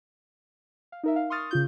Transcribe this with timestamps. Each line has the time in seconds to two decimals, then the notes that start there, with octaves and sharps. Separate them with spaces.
0.92 F5
1.03 D#4 A#4 E5
1.16 F5
1.30 C6 C#6 D#6 F6 A6
1.51 C#3 F4 G6